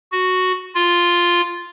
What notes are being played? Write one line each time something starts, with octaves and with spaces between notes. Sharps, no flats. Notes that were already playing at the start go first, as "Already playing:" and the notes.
F#4
F4